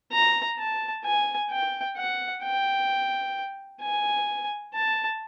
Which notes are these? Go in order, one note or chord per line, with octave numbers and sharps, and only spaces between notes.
A#5
A5
G#5
G5
F#5
G5
G#5
A5